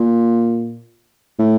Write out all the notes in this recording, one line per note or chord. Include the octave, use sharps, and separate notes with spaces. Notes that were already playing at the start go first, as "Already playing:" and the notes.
Already playing: A#2
A2